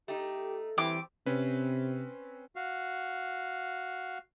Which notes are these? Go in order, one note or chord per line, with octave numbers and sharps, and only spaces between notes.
A3 D#4 G4
E3 G3 C4 G4 D6
C3 C4 C#4 B4
F#4 F5